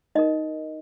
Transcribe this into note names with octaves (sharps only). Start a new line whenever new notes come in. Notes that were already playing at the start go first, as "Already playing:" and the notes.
D#4 A#4 D#5